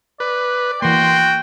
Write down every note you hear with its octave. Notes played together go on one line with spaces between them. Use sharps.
B4 D5
E3 A#3 F#4 G5 C6